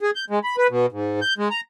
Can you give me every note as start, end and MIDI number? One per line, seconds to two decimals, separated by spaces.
0.01 0.11 68
0.16 0.25 91
0.30 0.39 56
0.44 0.56 83
0.58 0.67 71
0.70 0.86 47
0.92 1.20 44
1.22 1.34 91
1.38 1.48 56
1.51 1.61 82